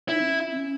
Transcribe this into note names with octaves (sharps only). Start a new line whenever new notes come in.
D#4 E4
C4
C#4
C4
C#4